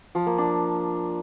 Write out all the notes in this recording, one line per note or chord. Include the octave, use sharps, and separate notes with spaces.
F3
A#3
D4